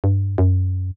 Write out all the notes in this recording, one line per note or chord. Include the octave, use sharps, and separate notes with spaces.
G2
F#2